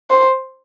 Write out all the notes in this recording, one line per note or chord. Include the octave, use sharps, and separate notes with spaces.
C5